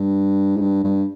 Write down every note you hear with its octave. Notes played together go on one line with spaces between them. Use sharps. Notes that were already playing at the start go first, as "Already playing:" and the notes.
Already playing: G2
G#2
G2
G2